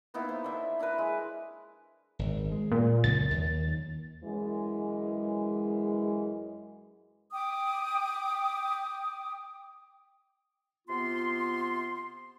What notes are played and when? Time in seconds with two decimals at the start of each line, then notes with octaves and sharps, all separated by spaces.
0.14 A#3 B3 D#4 E4
0.29 C5
0.44 D4 E5
0.79 D4 E4 A#4 B4
0.98 G#3
2.19 G#1
2.52 G#3
2.72 A#2
3.04 C#2 F#2 A6
3.31 D#2
4.23 F#2 E3 G#3
7.32 G5 D6 D#6
10.88 C3 B3 F4 C6